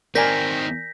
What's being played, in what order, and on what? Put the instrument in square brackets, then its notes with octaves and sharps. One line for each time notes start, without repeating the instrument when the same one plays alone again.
[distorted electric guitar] D#3 C4 [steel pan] A#4 D5 G#5 [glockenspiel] G6 A#6 B6